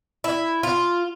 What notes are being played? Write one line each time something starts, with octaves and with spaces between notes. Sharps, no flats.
E4
F4